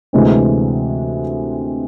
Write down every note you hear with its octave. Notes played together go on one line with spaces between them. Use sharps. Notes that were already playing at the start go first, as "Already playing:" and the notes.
D2 C3 E3 G#3 C4